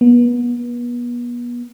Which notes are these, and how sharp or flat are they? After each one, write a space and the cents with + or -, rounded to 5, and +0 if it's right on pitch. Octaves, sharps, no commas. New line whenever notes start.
B3 -35